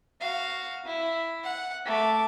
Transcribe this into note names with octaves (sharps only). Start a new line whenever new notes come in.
F#4 F5
E4
F#5
A3 D6